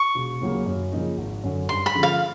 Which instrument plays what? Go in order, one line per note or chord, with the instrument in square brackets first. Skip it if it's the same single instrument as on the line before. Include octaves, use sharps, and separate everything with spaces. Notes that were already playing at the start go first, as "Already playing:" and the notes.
Already playing: [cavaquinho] C#6
[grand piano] E1
D#2 C#3 F#3 A#3
F#2
C#3 F3 A#3 D#4
G#1
F#2 D3
[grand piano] G2 [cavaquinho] C6
[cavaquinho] B5
[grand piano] D3 F3 G#3 C#4
[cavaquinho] F5